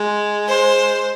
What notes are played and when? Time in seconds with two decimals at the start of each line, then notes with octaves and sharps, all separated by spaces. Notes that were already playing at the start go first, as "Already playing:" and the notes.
Already playing: G#3
0.48 C5